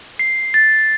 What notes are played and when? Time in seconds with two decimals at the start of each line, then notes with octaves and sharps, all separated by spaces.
0.19 C7
0.54 A6